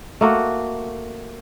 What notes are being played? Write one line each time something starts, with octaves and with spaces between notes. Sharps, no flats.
A3 A#3 F#4